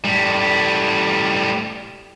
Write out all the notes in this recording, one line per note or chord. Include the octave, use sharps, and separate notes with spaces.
A2 G3